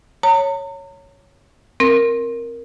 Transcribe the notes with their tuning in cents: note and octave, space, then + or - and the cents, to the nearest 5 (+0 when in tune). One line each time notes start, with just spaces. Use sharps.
C#5 +0 A#5 -40
C4 +20 A#4 +0